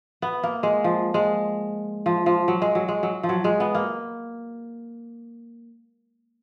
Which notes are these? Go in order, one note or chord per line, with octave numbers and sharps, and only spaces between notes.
B3
A#3
G#3
F3
G#3
F3
F3
F#3
G#3
F#3
G#3
F#3
F3
F#3
G#3
B3
A#3